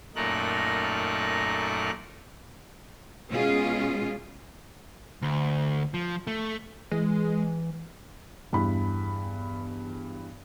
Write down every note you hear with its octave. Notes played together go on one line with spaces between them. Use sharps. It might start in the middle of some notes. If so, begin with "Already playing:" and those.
F#2 A#2 A3 D#4 A#4 F#6
B2 G#3 C#4 F4 G#4
D2
F3
A3
E3 G#3
E2 G2 E4 B5